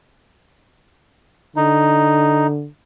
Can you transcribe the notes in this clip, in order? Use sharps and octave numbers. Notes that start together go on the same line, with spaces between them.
D3 D#4